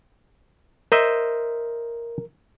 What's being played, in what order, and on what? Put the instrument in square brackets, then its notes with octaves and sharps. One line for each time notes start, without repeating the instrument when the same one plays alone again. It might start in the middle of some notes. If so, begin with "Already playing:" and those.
[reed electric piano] A#4 [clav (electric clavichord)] C5 D#5 E5